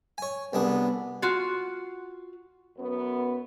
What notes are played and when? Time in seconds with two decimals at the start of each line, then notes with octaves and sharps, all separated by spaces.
0.18 C#5 G#5
0.53 C2 B3 D4 G#4
1.22 F4 F#4
2.77 F#2 B3